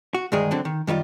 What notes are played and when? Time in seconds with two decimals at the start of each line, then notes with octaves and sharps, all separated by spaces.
0.14 F#4
0.32 D2 G2 D#3 G#3 G#4
0.51 D3 F#3 C4 D4
0.65 D#3
0.87 F#2 D#3 G3 F4